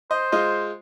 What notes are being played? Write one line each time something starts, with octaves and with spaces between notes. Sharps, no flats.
C5 D#5
G#3 F4 D#5